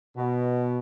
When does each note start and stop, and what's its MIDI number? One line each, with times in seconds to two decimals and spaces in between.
0.16 0.78 47